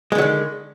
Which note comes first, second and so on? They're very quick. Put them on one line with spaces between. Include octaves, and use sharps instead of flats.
G#3 D3 F#3 D#3